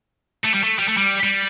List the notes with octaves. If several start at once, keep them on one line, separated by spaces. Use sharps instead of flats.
A3
G3
A3
G3
A3
G3
G3